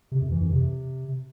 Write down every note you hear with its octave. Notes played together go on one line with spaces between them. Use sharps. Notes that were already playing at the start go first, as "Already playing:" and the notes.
C3
F2
E3
F2
C3